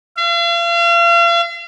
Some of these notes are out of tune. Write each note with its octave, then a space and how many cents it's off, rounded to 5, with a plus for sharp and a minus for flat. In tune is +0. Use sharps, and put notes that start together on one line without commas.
F5 -40